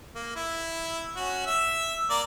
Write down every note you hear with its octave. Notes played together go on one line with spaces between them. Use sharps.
A#3
E4
C#4 F#4
E5 E6
A#3 A#4 D5